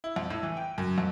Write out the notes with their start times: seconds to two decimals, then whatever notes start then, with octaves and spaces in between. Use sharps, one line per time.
0.04 E4
0.16 F2
0.30 A2
0.43 E3
0.57 G5
0.78 F#2
0.98 F2